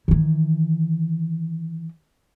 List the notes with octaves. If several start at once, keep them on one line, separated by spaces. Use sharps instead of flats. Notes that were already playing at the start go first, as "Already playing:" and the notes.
D#3 E3